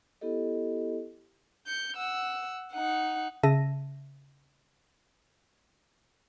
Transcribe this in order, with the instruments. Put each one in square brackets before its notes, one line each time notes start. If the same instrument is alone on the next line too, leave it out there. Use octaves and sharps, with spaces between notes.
[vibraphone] B3 E4 G4 A4 D#5
[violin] G6 C#7
F#5 E6
D#4 F#5
[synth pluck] C#3 E5 A5 A#6 D#7